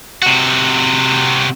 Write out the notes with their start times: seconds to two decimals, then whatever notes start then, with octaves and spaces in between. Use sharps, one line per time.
0.22 C3 F#4